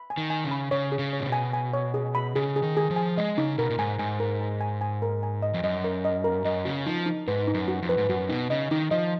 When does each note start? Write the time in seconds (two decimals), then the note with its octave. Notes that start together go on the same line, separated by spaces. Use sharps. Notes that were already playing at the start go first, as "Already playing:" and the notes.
Already playing: B5
0.10 G#5
0.17 D#3
0.30 G#5
0.44 C#3
0.51 B5
0.71 C#3 C#5
0.92 G#4
0.99 C#3
1.13 C#5
1.20 A#2
1.26 B2
1.32 G#5
1.53 G#5
1.73 C#5
1.94 G#4
2.15 B5
2.36 C#3 G#4
2.56 G#4
2.63 D#3
2.77 G#4
2.91 F3
2.96 G#5
3.17 G#3 D#5
3.37 C#3 D#4
3.59 B2 A#4
3.70 A#2
3.78 G#2 G#5
3.99 G#2 G#5
4.20 A#4
4.41 G#5
4.61 G#5
4.81 G#5
5.02 A#4
5.23 G#5
5.42 D#5
5.54 F2
5.63 F#2 D#5
5.84 A#4
6.05 D#5
6.24 A#4
6.45 F#2 D#5
6.65 C#3 F#4
6.86 F3 D#4
7.06 D#4
7.28 G#2 B4
7.47 D#4
7.54 F#2
7.68 F#4
7.82 F2
7.89 B4
7.98 G#2
8.09 F#2 F#4
8.29 B2 D#4
8.50 C#3 D#5
8.71 D#3 D#4
8.91 F3 D#5